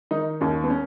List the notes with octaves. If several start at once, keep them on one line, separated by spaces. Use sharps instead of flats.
D#3 D#4
D#2 C#4
B3
C#4